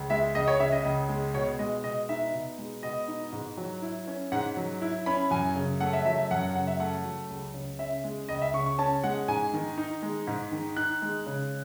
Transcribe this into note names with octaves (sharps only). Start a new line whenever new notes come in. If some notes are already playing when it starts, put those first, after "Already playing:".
Already playing: C#2
G#3 E5
C#2 D#5
C#5
C#3 E5
D#5
C#2
G#3
B2 C#5
G#3 D#5
B2 D#5
D#4 E5
B2
G#3
B2 D#5
D#4
G#2
F#3
E4
C#4
G#2 F#5
F#3
E4
C#4 B5
F#2 G#5
C#3
A3 F#5
E5
F#3 E5
E5
F#2 F#5
F#5
C#3 F#5
E5
A3 F#5
F#3
C#2
C#3
C#4 E5
G#3
C#2 D#5
E5
C#3 C#6
C#6
C#4 A5
G#3 F#5
G#2 G#5
D#3
D#4
G#3
G#2
D#3
D#4 F#6
G#3
C#3